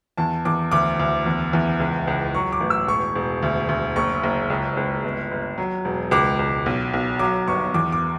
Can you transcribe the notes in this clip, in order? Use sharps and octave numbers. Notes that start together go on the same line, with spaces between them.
E2 A5
E2 D6
D2 D6
D2
E2
E2
C#2
C#2
F#3 C#6
D6
A1
E6
E1 C#6
E1
D2
D2
F#1 C#6
F#1
C#2
C#2
G1
G1
F#3
E1
C#2 D6
C#2
B1
B1
F#3 D6
G1 C#6
E2 D6
D6